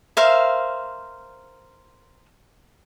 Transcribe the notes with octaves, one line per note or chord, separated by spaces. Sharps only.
A#4 C5 E5 F5